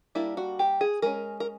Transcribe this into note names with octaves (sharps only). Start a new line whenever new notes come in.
G3 A#3 D4 E4
F#4
G4
G#4
G#3 C#4 A#4
A#4